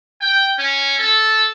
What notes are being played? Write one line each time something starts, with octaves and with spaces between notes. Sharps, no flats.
G5
C#4
A4